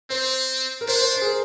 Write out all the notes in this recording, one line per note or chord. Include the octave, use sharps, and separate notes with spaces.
C4 C5
A#4
D4 C5
C5
C5
G#4
A#4